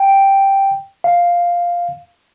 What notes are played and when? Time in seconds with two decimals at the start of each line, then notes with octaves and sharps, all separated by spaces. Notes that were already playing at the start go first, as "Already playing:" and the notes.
Already playing: G5
1.04 F5